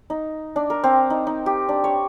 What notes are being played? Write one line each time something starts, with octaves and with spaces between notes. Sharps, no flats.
D#4
D4
A#4
C4
D#4
D#4
G4
D4
C#5